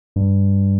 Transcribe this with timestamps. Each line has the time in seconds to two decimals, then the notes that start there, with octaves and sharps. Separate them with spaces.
0.16 G2